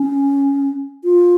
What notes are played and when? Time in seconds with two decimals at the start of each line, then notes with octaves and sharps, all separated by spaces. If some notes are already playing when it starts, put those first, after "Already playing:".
Already playing: C#4
1.04 F4